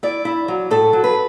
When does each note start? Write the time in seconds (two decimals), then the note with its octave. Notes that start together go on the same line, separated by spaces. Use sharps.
0.03 E4 D5
0.25 E4
0.48 F#3
0.70 A2 A4
0.93 F#3
1.04 B4